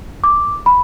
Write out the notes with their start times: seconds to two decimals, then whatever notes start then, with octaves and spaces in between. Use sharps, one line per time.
0.24 D6
0.66 B5